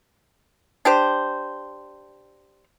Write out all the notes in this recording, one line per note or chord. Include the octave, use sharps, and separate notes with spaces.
D4 G4 C5